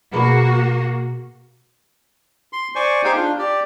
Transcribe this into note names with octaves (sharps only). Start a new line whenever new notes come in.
B2 A#3 F#4 G#4 B5
C6
C5 D5 G#5 C#6
D#4 G4 G#4 C5 F5 G5
D4 F4
G4 D5